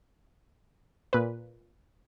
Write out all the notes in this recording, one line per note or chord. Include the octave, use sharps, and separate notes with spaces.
A#2 B4